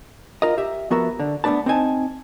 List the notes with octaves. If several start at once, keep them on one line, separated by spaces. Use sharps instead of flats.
F4 A#4 D#5
G4 E5
F3 B3 F#4 A#4 E5
D3
A3 B3 D4 B4 A5
C4 D#4 G#5 A5